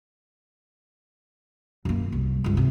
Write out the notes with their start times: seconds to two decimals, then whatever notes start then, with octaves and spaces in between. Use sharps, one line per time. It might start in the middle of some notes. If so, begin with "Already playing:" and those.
1.85 F#2 A#3
2.12 C2
2.44 G1 C#2
2.57 C3